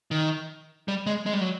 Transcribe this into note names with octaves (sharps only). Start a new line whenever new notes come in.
D#3
G3
G#3
G#3
G3
F#3